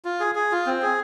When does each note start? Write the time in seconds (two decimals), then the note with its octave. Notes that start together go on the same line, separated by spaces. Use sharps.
0.05 F4
0.20 G#4
0.35 G#4
0.52 F4
0.67 C4
0.82 G#4